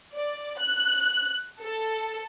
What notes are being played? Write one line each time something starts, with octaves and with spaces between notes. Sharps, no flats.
D5
F#6
A4